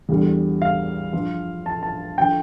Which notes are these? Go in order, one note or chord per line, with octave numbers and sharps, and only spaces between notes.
E2 D3 G3
F5
G2 F3
A5
A5
D3 F3 G5